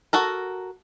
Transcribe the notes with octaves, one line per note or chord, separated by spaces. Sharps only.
F#4 A4 A#4